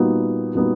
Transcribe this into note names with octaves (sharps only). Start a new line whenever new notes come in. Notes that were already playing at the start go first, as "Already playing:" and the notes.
Already playing: A#2 G3 B3 D#4 F#4
A#2 G3 B3 D#4 F#4